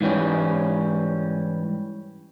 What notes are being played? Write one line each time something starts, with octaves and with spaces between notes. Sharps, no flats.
G#2 E3 G3 C#4